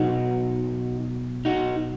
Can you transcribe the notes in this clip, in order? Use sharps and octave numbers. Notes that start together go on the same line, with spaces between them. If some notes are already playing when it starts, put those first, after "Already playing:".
Already playing: B2 F#3 D#4 F#4
D#4 F#4